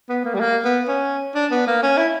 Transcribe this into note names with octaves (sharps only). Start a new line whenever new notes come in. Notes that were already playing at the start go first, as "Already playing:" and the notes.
B3
A#3
G3
A#3
B3
C#4
D4
B3
A#3
C#4
E4